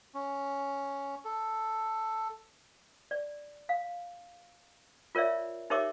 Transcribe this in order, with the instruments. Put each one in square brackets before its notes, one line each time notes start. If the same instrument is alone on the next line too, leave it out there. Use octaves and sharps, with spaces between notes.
[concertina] C#4
A4
[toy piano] D5
F5
F4 A#4 C#5 D5 E5
D#4 G4 A#4 C#5 E5 D6